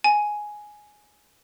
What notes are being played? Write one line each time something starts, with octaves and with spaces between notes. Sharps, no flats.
G#5